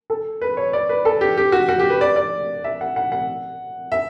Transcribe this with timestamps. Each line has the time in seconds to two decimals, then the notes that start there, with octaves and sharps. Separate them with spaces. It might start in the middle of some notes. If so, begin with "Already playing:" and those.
0.10 A4
0.42 B4
0.57 C#5
0.73 D5
0.89 B4
1.05 A4
1.21 G4
1.37 G4
1.52 F#4
1.69 F#4
1.79 G4
1.90 B4
2.01 D5
2.16 D5
2.64 E5
2.81 F#5
2.96 F#5
3.12 F#5
3.92 E5